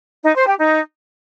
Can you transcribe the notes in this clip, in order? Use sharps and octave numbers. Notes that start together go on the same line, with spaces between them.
D#4
C5
G4
D#4